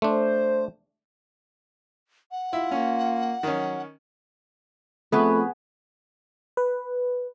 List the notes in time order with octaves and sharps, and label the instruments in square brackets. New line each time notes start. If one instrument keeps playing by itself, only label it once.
[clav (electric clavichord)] A3 D4 [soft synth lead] C5
[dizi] F#5
[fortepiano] E4 [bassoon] F4
[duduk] A#3 [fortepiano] C#4
[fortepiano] D#3 C#4 [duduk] F#3
[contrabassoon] F2 [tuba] A3 [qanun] B3 G#4 B4 [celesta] B5 C#6
[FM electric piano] B4